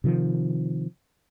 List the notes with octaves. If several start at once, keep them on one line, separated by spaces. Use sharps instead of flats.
C3 D#3 F3